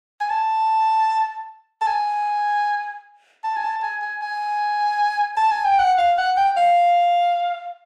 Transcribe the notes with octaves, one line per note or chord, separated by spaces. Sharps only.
G#5
A5
A5
G#5
A5
G#5
A5
G#5
G#5
G#5
A5
G#5
G5
F#5
F5
F#5
G5
F5